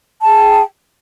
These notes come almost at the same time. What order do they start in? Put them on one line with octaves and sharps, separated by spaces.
A5 G#4 G5